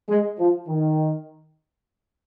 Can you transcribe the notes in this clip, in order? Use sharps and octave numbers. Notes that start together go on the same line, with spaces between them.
G#3
F3
D#3